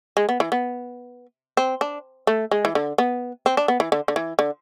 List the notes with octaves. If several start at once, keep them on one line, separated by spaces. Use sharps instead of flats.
G#3
B3
E3
B3
C4
D4
A3
G#3
E3
D3
B3
C4
D4
B3
E3
D3
D3
E3
D3